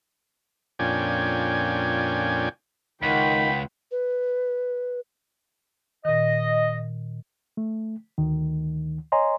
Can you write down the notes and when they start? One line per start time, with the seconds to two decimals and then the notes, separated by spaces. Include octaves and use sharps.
0.79 F2 A#2 C#4 D4 G5 G#5
3.03 C#2 D#3 F#5 G5 B5
3.91 B4
6.05 A#2 D#3 D#5
7.57 A3
8.18 D2 D#3
9.12 C#5 D#5 G#5 A#5 C6